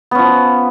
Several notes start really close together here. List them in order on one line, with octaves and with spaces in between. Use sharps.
B3 C#4 F3